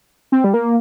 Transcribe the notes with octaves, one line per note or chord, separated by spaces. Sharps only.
C4
G3
A#3